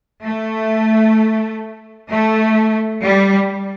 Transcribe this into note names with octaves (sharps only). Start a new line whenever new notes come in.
A3
A3
G3